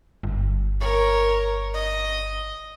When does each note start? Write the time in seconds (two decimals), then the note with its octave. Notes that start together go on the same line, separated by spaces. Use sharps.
0.23 G1
0.80 A#4 C#5
1.74 D#5